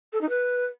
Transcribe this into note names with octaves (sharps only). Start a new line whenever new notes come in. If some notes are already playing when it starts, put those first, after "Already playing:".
A4
D#4
B4